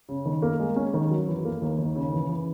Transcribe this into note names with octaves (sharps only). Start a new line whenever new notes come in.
C#3
D#3
A#3
G#3
C#4
D#3
F#3
E3
A#3
D#2
D#3
C#3
E3
E3